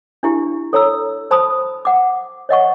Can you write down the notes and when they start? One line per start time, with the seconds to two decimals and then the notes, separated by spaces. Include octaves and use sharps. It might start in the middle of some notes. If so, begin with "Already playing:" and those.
0.23 D4 E4 G4
0.73 A4 C#5 A#5 E6
1.31 C5 A5 B5 D#6
1.85 F#5 D6
2.49 C#5 D#5 F#5 C#6